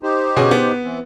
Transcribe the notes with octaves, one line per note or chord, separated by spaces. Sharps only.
D#4 G4 C5
B2 C#4 G#4
B3
E3 C4